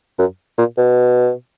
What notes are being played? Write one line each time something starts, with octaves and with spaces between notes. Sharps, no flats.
F#2
A#2
B2